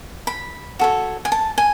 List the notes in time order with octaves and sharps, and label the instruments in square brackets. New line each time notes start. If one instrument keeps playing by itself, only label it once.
[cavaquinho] B5
F#4 A4 C#5
G#5
A5
G#5